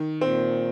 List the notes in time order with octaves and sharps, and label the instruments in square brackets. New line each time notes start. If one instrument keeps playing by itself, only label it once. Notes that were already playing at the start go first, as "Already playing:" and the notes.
Already playing: [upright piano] D#3
[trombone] A#2 [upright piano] C4